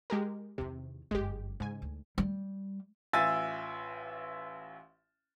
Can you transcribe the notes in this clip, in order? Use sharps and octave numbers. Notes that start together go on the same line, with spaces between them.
G#3 G4 A#4
E2 C3 D#3
G1 F#2 G#3 G4
G#2 C#3 G#5
D2
G3
A1 F4 E5 G#5 E6 A6